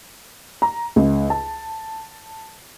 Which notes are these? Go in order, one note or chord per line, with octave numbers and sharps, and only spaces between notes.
A#5
C#2
A5